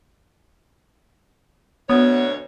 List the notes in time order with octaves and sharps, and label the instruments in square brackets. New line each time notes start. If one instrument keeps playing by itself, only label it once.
[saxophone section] D2 B2 C#5 [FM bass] B3